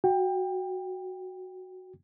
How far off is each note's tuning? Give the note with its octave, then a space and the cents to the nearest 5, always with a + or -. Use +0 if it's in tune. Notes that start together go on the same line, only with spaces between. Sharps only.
F#4 +0 G5 +20